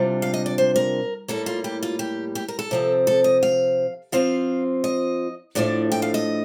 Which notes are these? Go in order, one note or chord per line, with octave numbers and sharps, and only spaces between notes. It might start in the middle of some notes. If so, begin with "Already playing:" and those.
Already playing: C3 G3 D4 F4
F5
D#5
D5
C5
A#4
A2 G3 A#3 A4
F4
G4
F4
G4
G4
A#4
A4
C3 F3 C4
A4
D#5
F5
F3 C4 F4 F5
D#5
A2 F3 A3 D4 D5
G5
F5
D#5